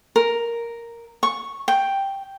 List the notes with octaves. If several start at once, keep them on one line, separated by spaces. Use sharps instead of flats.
A#4
C#6
G5